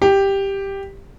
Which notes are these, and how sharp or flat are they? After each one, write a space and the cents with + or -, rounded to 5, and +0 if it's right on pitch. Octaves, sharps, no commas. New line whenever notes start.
G4 +5